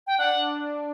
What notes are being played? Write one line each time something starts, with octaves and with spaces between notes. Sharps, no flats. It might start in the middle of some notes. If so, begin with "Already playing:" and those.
G5
D4 F#5